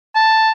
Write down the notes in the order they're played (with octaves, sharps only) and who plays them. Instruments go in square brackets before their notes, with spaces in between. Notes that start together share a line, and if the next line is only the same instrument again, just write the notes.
[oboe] A5